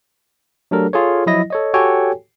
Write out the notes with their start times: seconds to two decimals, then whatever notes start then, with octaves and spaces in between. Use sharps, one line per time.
0.71 F#3 A3 D4 G4 A4 A#4
0.93 F4 G#4 A4 C#5
1.26 F3 F#3 E4 D#5 A#6
1.50 A4 C#5 D#5
1.74 F#4 G4 A4 C#5 G5 G#5